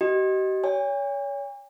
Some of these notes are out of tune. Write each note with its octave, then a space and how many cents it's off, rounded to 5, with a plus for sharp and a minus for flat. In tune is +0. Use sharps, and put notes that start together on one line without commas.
G4 -45 D#5 +0
C#5 +30 G#5 -45